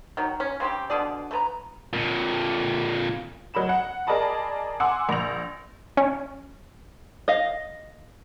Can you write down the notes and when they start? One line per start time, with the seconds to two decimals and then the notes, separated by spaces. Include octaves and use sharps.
0.17 D#3 F#3
0.40 C#4
0.60 C#3 C4 D4 G4
0.90 B2 D3 G#4 D5
1.31 A3 B4 A#5
1.93 F2 A#2
3.54 F#3 D#5 B5 E7
3.69 F#5
4.07 G#4 A#4 D5 D#5 A5 B5
4.80 F#5 G#5 C6 D6 E6
5.09 A#1 A#6 F7
5.97 C#4
7.28 D#5 F5